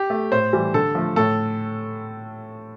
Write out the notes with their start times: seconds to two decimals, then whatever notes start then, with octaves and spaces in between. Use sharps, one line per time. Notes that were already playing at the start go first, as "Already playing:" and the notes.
Already playing: G4
0.10 A3
0.32 A2 C5
0.53 E3 G3
0.74 D3 A4
0.95 F3 A3
1.16 A2 A4